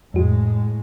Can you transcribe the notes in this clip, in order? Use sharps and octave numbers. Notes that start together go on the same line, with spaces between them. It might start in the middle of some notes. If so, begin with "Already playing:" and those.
F2 A2 G#3 F#4